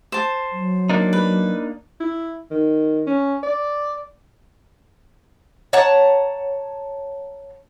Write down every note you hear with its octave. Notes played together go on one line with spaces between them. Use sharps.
C5 A5
F#3
A#3 D4 D#4
B4
E4
D#3
C#4
D5
C#5 F#5 A5 A#5